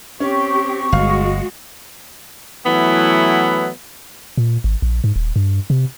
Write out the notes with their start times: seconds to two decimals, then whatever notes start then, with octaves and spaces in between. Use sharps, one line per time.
0.20 C4 C#4 G4 C#6
0.92 G1 G#3 F#4 F5
2.66 E3 F#3 A3 B3 E4 F#5
4.37 A#2
4.64 G#1
4.82 A#1
5.04 G#2
5.16 D#1
5.36 G2
5.70 C3